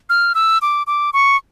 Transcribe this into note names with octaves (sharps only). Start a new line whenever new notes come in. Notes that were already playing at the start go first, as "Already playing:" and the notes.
F6
E6
D6
D6
C#6